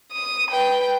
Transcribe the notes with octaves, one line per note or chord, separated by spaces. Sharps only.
D#6
B4 G5